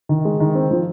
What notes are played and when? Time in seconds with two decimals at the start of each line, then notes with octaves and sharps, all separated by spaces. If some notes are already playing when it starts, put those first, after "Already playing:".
0.09 D#3
0.25 G#3
0.40 D#3
0.55 C4
0.71 F3